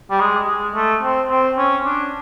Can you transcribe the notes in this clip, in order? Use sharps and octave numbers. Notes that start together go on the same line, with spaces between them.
G3
G#3
G#3
A3
C4
C4
C#4
D4